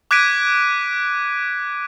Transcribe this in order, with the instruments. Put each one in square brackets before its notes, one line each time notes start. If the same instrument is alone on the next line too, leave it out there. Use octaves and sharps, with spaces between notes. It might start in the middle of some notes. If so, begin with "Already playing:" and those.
[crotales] D6 F#6 G#6 B6 D7 D#7